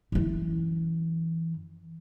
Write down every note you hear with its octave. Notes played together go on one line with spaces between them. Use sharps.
F#2 E3